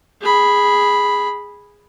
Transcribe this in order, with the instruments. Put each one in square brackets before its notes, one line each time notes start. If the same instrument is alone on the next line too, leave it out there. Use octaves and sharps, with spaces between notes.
[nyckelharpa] G#4 B5